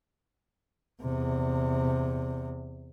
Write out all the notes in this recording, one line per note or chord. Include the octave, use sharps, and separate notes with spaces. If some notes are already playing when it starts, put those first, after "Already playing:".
E2 C3